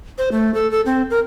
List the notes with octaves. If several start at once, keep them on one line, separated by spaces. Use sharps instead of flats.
C5
A3
A4
A4
C4
A#4